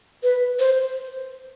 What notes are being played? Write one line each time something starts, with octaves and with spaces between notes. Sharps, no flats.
B4
C5